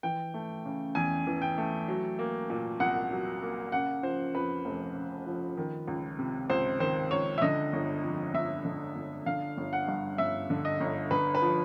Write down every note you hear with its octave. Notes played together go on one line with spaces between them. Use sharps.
E3 G5
A3
C#3
E2 G#5
E3
G5
A3
F#3
A#3
A#2
C2 F#5
F#3
A#3
C#3 F#5
F3 C5
F2 B4
F1
C#3
F3
D#3
C#2
C3
C#2 C5
D#3 C5
C#2 C#5
E5
D3 D#5
G1
F2
G1 E5
D3
G1
D3 F5
G1
F#5
G2
G1 E5
D3
D#5
G1
D3 B4
B4
F3